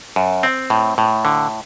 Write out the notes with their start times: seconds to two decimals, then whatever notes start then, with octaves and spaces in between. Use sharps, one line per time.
0.16 F#2
0.43 C4
0.70 A2
0.98 A2
1.25 D3